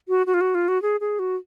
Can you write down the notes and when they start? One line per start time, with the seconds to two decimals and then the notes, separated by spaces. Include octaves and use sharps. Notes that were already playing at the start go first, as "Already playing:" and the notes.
0.08 F#4
0.27 F#4
0.34 F4
0.41 F#4
0.55 F4
0.68 F#4
0.82 G#4
1.01 G#4
1.19 F#4